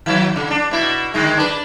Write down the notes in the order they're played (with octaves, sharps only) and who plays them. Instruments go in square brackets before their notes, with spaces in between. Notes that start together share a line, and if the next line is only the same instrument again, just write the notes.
[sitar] D#3 F#3
C#3
D4
B2 E4
D3 D#3 G#3
D4 B4